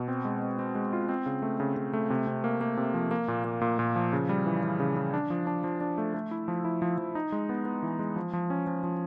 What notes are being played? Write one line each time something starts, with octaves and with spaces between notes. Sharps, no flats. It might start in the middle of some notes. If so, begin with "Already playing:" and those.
Already playing: B2
C4
G#3
C4
C4
G#3
F4
C4
C#3
A3
C#3
C#3
A3
C3
C3
A#3
A#3
C3
F3
A#3
A#2
A#3
A#2
A#2
F3
C#3
G3
E3
E3
C#3
C#3
D4
F3
D4
F3
D4
A3
A3
E4
F3
E4
F3
F3
D#4
G#3
B3
B3
E3
G#3
F3
F3
C#4
F3
F3